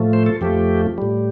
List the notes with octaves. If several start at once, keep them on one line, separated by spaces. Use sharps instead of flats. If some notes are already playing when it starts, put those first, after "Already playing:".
Already playing: A2 F3 A3
C5
A4
F2 F3 A3 G4
A2 G3